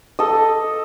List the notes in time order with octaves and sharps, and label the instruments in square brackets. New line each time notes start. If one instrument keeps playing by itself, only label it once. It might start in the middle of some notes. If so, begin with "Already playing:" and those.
[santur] A4 D#5